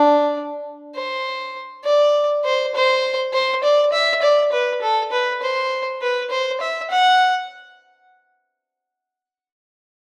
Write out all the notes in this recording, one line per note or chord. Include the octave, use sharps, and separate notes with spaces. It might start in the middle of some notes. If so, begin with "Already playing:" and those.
Already playing: D4
C5
D5
C5
C5
C5
D5
E5
D5
B4
A4
B4
C5
B4
C5
E5
F#5